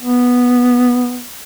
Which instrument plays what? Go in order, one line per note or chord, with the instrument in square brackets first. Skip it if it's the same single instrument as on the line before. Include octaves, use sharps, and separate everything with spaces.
[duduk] B3